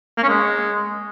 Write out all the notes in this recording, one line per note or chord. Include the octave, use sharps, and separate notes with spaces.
A#3
C#4
G#3